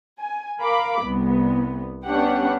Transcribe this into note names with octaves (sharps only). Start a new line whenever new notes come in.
G#5
A#4 F5 B5 D6
C2 B3
B3 C#4 D4 G4 F#5